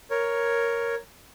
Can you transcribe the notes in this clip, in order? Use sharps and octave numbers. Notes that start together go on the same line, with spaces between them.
A#4 C#5